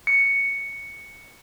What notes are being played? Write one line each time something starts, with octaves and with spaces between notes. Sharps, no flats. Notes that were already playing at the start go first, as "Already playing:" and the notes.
C#7